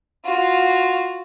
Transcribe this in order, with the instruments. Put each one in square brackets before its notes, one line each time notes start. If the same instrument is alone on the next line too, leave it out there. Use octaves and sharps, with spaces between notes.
[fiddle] F4 F#4